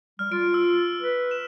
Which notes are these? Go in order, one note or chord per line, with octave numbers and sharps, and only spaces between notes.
G3 F6
F4 D7
E6
B4
E7